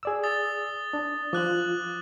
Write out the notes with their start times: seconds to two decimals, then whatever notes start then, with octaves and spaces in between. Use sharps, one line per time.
0.03 G#4 D5 E6
0.23 D#6 A6 G7
0.93 D4
1.33 F3 F4 D6 F#6 F#7